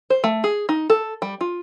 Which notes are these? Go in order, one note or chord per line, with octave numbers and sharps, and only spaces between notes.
C5
A3
G#4
D#4
A4
G3
F4